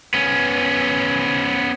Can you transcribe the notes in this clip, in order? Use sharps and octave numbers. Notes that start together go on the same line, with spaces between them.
B3 C#4